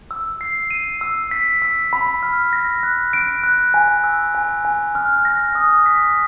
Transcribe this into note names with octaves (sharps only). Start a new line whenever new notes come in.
E6
C7
D#7
E6
B6
E6
B5
F6
A#6
F#6
D7
F#6
G#5
E6
G#5
G#5
F6
A#6
D#6
B6